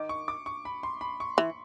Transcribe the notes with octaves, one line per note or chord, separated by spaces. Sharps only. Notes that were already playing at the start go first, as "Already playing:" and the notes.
Already playing: D#3 D6
C#6
D6
C#6
B5
C6
B5
C#6
E3